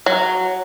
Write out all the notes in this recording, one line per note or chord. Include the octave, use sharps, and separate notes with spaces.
F#3